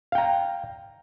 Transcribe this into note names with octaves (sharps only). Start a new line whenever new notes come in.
F5 G5 A#5